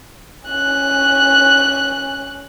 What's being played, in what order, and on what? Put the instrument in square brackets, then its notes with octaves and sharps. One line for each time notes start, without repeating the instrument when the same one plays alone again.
[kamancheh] C#4 F#6